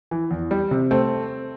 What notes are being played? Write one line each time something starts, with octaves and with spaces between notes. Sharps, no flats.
E3
E2
G3
C3
A3 C4